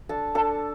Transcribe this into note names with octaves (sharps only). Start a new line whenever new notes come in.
D4 A4 A5
D4 A4 A5